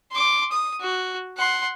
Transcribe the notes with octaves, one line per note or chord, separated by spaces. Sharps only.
C6 D6
D#6
F#4
F#5 C6